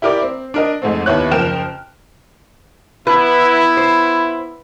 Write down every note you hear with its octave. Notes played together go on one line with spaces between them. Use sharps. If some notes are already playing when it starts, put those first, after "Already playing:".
E4 G4 A#4 D5 D6
C4
D4 A#4 D#5
F2 G#2 A3 C4
D#2 B3 E4 C#5 F#6
F#1 F3 A#4 G5 F6 E7
B3 E4 B4
C5